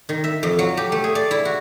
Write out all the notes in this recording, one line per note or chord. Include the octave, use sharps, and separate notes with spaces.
D#3
E5
F2
F#3
G4
A3
G#4
D5
E4
F#4